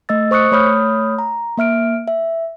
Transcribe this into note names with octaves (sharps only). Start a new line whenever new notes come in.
A3 D#5 E6 A6
C5 C#6 D#6 F#6 C#7
A3 C#5 B5 D#6 F6 G6
A#5
A#3 E5 F6 D7
E5